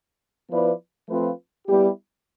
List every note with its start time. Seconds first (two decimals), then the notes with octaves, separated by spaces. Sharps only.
0.50 F3 B3 E4 B4 D5
1.08 F3 A3 C4 F4 B4
1.67 G3 B3 E4 G4